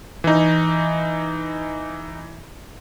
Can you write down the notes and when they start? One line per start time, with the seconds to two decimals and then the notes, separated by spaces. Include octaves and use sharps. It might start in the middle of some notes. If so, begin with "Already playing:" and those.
0.24 E3 D#4